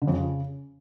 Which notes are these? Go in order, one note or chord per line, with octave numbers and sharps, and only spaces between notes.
D3
F2
C#3